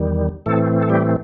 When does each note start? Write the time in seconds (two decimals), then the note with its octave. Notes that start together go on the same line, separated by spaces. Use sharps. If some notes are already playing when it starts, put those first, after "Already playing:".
Already playing: E2 D#3 G3
0.46 A2 E3 A3 C4 A4
0.82 A4
0.90 G3 G4